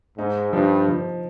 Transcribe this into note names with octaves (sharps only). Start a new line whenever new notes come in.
G#2 D#4
G2 F3
F3